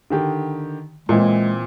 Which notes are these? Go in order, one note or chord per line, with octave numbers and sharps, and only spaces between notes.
D3 D#3 G4
A#2 E3 G#3 C4